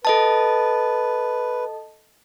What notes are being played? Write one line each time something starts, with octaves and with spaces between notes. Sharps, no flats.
A4 B4 D#5 A5